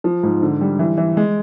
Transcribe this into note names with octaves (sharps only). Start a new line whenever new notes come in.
F3
G#2
D3
G3
E3
E3
G#3